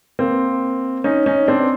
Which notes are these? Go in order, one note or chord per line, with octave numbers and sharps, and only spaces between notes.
A#3 C4
C#4 D#4
C#4 D#4
C4 D4